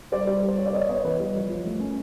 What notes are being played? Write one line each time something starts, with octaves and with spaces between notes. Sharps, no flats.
G3 C5 D5
G3
G3
C5
G3 C#5
D5
B3 C#5 D#5
B3 C#5 D#5
E3 B4 C#5
G3
F3
F3
A3
C#4